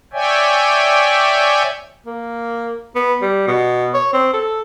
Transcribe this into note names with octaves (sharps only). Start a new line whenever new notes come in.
C#5 D5 E5 G5 G#5
A#3
B3
G3
B2
C#5
C4
A4